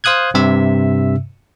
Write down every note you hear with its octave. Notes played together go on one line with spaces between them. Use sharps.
C5 F5 D#6 F#6 G#6
G2 C3 E5 E6